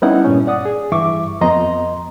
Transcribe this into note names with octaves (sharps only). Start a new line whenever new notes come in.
G3 B3 C#4 D#4 E4 F#5
G2 A#2 C#4
D5 F#5 D#6
G#4
G2 E3 E5 C#6 D6
F2 B3 D#5 A#5 C6